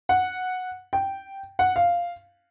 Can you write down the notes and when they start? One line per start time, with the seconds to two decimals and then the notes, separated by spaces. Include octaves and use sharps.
0.09 F#5
0.93 G5
1.59 F#5
1.76 F5